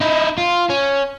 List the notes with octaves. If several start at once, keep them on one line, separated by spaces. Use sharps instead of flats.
D#4 E4
F4
C#4